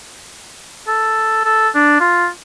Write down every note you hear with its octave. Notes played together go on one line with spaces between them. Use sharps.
A4
A4
D4
F4